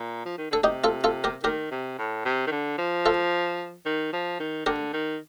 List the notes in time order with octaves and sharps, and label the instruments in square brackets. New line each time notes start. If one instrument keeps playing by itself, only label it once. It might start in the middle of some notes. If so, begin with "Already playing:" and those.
Already playing: [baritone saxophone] A#2
F3
D#3
[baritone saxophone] D3 [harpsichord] A4
[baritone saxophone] C3 [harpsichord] D#4 G4
[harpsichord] F4 A4
F4 A4
G4 A#4
[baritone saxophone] D#3 [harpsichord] G4 A#4
[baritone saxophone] C3
A2
C3
D#3
D3
F3
[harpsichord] F4 A4
[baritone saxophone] D#3
F3
D#3
[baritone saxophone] D3 [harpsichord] G4 A#4
[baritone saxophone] D#3